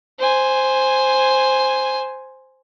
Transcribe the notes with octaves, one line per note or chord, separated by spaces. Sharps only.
C5 G#5